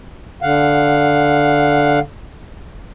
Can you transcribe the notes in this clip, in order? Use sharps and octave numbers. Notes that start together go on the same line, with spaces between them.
D3 F5 F#5